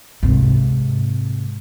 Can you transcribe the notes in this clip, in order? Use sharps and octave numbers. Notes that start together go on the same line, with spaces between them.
G#2 C3